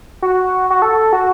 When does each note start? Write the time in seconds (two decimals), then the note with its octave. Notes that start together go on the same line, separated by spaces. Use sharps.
0.22 F#4
0.70 F#4
0.82 A4
1.13 F#4